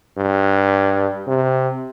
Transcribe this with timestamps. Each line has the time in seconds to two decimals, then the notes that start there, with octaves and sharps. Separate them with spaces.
0.18 G2
1.27 C3